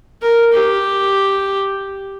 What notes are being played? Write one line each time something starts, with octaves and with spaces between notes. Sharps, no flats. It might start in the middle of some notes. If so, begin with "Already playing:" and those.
A#4
G4